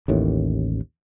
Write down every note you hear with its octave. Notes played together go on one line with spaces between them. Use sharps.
A1 D#2 A2